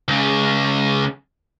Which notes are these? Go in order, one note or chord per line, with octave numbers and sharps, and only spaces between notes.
C#2 C#3